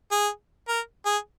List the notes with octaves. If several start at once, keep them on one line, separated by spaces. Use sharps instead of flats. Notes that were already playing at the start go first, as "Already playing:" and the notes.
G#4
A#4
G#4